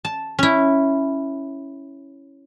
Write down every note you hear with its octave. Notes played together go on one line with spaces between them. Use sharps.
A5
C#4 E4